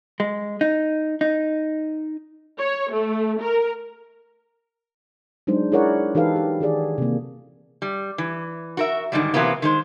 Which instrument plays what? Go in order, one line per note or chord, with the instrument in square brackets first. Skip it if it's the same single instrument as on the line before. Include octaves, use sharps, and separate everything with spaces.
[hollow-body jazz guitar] G#3
D#4
D#4
[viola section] C#5
A3
A#4
[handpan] F#3 G#3 D4 D#4 C5
E4 G#4 A#4 C#5 D5 F#5
E3 D#4 G4 A4 B4 F5
G4
D#3 F#4 G#4 D5
C3 A#3
[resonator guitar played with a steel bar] G3
E3
F#4 A#4 E5
G#2 D3 D#3 F#3 G3
C3 E3 F#3 A#3 B3
D#3 G#3 C5